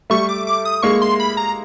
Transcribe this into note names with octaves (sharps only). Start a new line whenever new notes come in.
G3 A3 C#6
D6
D6
D#6
G#3 A#3 C#6
C6
B5
A#5